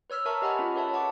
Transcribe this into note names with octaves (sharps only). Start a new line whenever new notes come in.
B4 C#5 E6 F6 B6
A#4 E5 A5 A#5 C#6
G4 D#5 F#5 G#5 B5
C#4 F4
G#4 B4 C#5 E5 A5
F#5 A5 C#6 D6